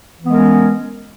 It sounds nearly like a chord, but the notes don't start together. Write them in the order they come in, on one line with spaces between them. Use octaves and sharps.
E3 B3 G#3 A#4 C#4